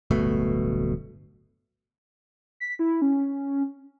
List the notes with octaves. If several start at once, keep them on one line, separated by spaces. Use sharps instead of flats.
D1 G1 B2 A3
B6
E4
C#4